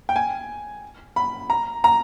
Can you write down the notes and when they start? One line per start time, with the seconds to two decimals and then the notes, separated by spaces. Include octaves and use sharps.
0.09 G5
0.16 G#5
1.16 B5
1.50 A#5
1.84 A#5